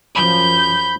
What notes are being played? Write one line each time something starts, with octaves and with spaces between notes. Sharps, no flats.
F#2 F3 B5 G6